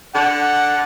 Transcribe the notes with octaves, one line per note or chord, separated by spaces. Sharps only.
D3 F#5